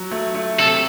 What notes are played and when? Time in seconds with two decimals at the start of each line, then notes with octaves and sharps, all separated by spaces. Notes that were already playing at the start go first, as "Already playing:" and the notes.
Already playing: F#3
0.11 A3
0.35 A3
0.59 C3 A4